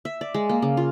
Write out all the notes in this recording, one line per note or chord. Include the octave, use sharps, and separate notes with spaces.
E5
D5
G#3
A#3
C#3
F4